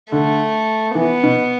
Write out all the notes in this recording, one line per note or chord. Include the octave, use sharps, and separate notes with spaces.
D3 A3
E3 B3
B2